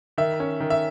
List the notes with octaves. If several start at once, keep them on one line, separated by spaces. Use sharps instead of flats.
D#3 E5
C#4
D#3
E5